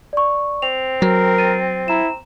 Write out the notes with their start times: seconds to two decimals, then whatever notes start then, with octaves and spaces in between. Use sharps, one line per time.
0.13 D5 C#6
0.62 C4 F7
1.02 F#3 A#4
1.38 A6 D#7
1.88 E4 A#5 E7